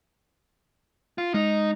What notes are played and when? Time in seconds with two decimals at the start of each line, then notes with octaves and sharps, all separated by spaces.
1.18 F4
1.34 G#3 D#4